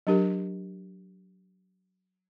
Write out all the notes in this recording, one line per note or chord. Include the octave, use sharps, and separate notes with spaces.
F#3 D4 G4 A#4